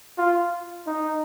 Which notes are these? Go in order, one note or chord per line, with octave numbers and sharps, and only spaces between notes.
F4
D#4